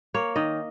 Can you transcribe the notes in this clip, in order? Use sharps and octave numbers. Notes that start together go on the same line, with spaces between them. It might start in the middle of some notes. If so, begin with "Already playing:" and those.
A#3 C#5
D#3 D#5